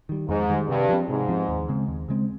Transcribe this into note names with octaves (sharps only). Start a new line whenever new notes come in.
D#3 G3
F2 G#2
D#3 G3
G2 C3
F3 C4
G#2 C3
F3 C4
D#2
C#3 G#3 C4
D#2
C#3 G#3 C4